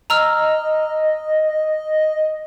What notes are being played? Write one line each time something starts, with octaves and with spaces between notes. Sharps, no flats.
D#5 A#5 E6 F6